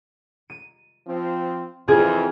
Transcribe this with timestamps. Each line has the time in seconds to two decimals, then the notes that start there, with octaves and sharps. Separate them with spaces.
0.50 D#7
1.07 F3 C4
1.88 F2 E3 C4 F4 G#4